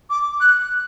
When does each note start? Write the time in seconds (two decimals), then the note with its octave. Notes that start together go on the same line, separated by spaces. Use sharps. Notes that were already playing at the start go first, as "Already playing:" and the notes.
0.10 D6
0.40 F#6